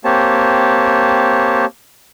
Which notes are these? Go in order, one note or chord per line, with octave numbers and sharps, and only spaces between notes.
A#3 C4 G4 C#5 A5